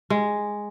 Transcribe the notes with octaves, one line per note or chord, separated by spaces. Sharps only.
G#3